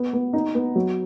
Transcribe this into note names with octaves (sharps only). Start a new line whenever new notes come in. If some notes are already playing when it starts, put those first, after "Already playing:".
Already playing: B3
B3
D#4
B3
F#3